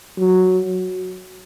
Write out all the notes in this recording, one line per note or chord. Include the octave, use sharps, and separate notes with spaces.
F#3